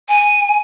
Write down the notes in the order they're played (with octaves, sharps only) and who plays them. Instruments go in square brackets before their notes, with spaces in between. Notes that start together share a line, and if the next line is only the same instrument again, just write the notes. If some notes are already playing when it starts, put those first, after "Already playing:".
[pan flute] G#5